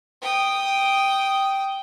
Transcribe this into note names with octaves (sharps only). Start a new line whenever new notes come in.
G5 D#6